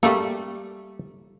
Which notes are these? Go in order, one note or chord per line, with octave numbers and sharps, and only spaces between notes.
G3 A3 A#3 A4